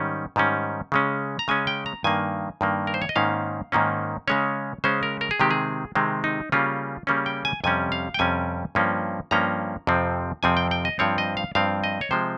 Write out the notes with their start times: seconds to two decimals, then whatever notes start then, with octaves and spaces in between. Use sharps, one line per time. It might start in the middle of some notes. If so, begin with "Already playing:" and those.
Already playing: G#2 D#3 G3 C#4
0.36 G#2 D#3 G3 C#4
0.92 C#3 G#3 C#4
1.39 A#5
1.48 C#3 G#3 C#4 G#5
1.67 G5
1.86 A#5
2.04 G2 D#3 A#3 G#5
2.61 G2 D#3 A#3
2.87 A#4
2.94 C5
3.02 C#5
3.09 D#5
3.16 G#2 D#3 A#3 C#4 F5
3.72 G#2 D#3 A#3 C#4
4.28 C#3 G#3 C#4 C#5
4.84 C#3 G#3 C#4 C5
5.03 A#4
5.21 A#4
5.31 G#4
5.40 C3 D#3 G#3 C4 G4
5.51 G#4
5.95 C3 D#3 G#3 C4
6.24 D#4
6.52 C#3 G3 A#3 C#4 F4
7.07 C#3 G3 A#3 C#4
7.26 G5
7.45 G#5
7.64 F2 C3 G3 C#4 G#5
7.92 F5
8.14 G5
8.19 F2 C3 G3 C#4 G#5
8.75 G2 F3 A#3 C#4
9.31 G2 F3 A#3 C#4 A#5
9.87 F2 C3 F3 C4
10.43 F2 C3 F3 C4 G#5
10.57 G5
10.71 G5
10.85 D#5
10.99 G2 F3 C4 C#5
11.18 D#5
11.37 F5
11.55 G2 F3 C4 F5
11.84 D#5
12.01 C#5
12.11 C3 F3 G#3 C5